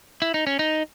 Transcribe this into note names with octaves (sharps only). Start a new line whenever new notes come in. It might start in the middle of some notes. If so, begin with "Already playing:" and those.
E4
D#4
C#4
D#4